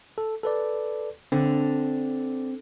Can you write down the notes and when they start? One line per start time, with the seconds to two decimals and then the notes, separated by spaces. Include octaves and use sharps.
0.18 A4
0.43 A4 B4 D5
1.32 D3 C4